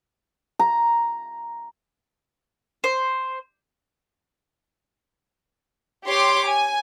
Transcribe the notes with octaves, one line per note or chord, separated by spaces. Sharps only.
A#5
C5
G4 C#5 C6 D6
G#5